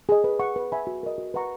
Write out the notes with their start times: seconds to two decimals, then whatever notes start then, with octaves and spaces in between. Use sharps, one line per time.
0.09 G#4 D#5
0.24 B4
0.40 F#5 C#6
0.56 B4
0.72 E5 G#5 B5
0.87 F#4
1.03 A#4 D#5
1.18 F#4
1.34 B4 F#5 A#5 C#6